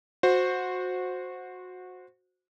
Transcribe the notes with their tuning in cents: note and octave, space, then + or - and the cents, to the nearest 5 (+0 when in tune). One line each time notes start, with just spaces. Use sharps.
F#4 -20 C5 +0